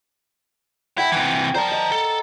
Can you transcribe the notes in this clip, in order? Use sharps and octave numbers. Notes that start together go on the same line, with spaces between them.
E4 F#5 G5 A5
C3 E3
A#4 C5 D5 A5 A#5
D#5
A4